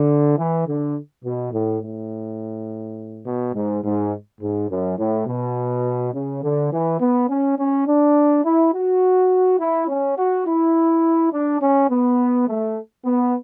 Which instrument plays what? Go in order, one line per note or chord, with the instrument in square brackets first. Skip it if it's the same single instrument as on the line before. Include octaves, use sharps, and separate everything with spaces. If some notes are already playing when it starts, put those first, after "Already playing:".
Already playing: [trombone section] D3
E3
D3
B2
A2
A2
B2
G#2
G#2
G#2
F#2
A2
B2
C#3
D3
E3
B3
C#4
C#4
D4
E4
F#4
E4
C#4
F#4
E4
D4
C#4
B3
A3
B3